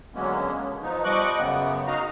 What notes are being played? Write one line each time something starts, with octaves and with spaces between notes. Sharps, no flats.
D3 F#3 G#3 A#3 B3 C#4
B2
F3 B3 D#4
F3 G3 D#5 C#6 D6 F#6
F#2 C#3 B3
D#4 F#4 D#5 F5 A#5